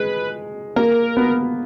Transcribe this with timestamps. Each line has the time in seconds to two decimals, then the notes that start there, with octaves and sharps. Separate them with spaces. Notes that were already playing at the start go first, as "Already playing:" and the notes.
Already playing: G#3 B4
0.76 A#3 A#4
1.17 B3